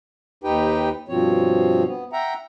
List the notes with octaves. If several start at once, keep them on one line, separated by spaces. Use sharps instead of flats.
D#2 D#4 G4 B4 G5
G2 B2 F3 C4 C#5
B3
E5 F#5 G5 A#5